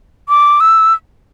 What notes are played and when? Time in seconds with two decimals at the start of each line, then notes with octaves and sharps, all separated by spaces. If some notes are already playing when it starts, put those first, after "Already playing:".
0.29 D6
0.60 E6